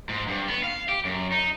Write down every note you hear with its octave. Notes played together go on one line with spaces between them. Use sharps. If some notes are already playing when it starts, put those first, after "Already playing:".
G#2
G2
B3
F5
G4
F#2
D#4